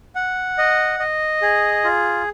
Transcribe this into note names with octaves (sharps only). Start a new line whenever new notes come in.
F#5
D#5
D#5
G#4
F4